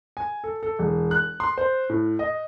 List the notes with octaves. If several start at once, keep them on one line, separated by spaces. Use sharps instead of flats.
G#5
A4
A4
E1
F#6
C6
C5
A2
D#5